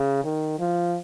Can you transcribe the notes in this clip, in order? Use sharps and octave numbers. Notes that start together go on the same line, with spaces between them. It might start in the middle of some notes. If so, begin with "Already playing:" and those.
Already playing: C#3
D#3
F3